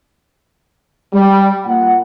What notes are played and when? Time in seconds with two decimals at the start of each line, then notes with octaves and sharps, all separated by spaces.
1.13 G3
1.65 A#2 F#5